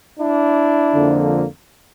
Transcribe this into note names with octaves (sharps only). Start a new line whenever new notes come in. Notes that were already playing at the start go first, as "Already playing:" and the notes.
D4 E4
F2 D3 F3 A#3